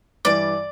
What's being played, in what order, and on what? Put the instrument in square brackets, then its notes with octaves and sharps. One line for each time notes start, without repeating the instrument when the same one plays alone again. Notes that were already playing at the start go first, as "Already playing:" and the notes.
[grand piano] G2 E3 G3 [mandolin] D5